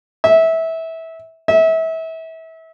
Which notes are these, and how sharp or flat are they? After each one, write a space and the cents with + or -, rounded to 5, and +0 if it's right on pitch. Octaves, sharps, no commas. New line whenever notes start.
E5 -20
E5 -30